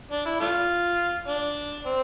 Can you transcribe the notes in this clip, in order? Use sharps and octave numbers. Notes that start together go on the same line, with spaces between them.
D4
E4
A3 D4 F4
D4
C4